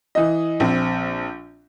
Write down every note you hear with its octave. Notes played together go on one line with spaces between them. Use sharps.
E3 D#5
A#1 C4